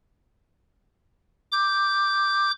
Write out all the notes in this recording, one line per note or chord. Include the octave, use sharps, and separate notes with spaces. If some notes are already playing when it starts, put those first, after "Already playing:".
D6 G6